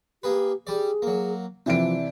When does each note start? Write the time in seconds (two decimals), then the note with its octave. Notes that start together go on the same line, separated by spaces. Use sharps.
0.23 A#3 G4 G#4 B4
0.67 G3 G#4 D5
1.02 F#3 A#3
1.66 C3 E3 F3 D4 D7